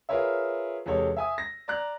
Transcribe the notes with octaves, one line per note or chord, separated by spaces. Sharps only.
F4 G#4 A#4 B4 C#5 E5
E2 C3 G#3 A4 C#5
E5 G#5 D#6
A#6
D5 A#5 F#6